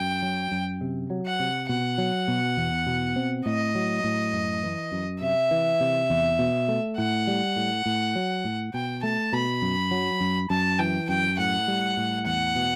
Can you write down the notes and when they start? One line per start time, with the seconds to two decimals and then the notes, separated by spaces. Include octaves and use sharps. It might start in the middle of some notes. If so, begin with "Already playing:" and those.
Already playing: F#2 G5
0.22 F#3
0.52 F#2
0.81 C3
1.10 F#3
1.26 F#5
1.40 C3
1.69 B2 F#5
1.98 F#3
2.28 B2
2.57 E2
2.87 B2
3.16 C4
3.46 A2 D#5
3.75 F#3
4.04 A2
4.33 F#2
4.63 E3
4.92 F#2
5.21 C3 E5
5.51 E3
5.80 C3
6.10 E2
6.39 B2
6.68 A3
6.98 A2 F#5
7.27 G3
7.56 A2
7.86 A2
8.15 F#3
8.44 A2
8.74 B2 G5
9.03 A3 A5
9.33 B2 B5
9.62 F#2
9.91 F#3
10.21 F#2
10.50 F#2 A5
10.79 E3 G5
11.09 F#2 G5
11.38 A2 F#5
11.68 G3
11.97 A2
12.26 E2 F#5
12.56 B2